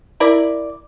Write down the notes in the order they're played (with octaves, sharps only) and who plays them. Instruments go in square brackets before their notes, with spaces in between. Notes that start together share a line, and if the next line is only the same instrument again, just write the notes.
[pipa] E4 A#4 D5